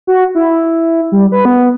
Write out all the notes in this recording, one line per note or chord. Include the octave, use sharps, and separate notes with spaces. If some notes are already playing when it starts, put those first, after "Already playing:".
F#4
E4
G3
B4
B3